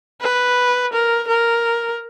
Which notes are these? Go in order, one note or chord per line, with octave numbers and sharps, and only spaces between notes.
B4
A#4
A#4